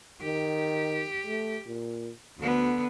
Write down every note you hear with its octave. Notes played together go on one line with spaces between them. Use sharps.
D#3 G4
A3
A#2
D2 D3 B3